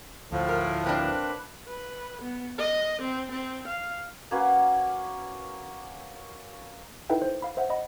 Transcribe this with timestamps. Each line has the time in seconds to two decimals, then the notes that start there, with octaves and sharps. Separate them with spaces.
0.32 D2 A2 F3
0.49 A#4
0.84 A#3 C4 D4 B4
1.68 B4
2.21 B3
2.59 D#5
3.02 C4
3.31 C4
3.67 F5
4.31 A#3 C#4 F#4 B4
7.10 D#4 E4 A4 B4 E5 G5
7.22 C5
7.42 F5 B5
7.57 C5 E5 F#5
7.70 D#5 F#5 B5